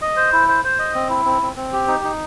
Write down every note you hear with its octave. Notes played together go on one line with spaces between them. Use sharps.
D#5
C5
E4
C5
C5
D#5
C4
E4
C4
C4
C4
G4
D#4
D#4